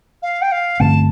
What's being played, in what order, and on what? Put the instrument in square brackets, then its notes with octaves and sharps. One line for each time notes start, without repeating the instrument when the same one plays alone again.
[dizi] F5
G5
F5
[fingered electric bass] G2 D3 A3 C4 [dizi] A5